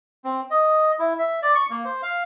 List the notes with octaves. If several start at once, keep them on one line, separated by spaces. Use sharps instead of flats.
C4
D#5
E4
E5
D5
C#6
A#3
C5
F5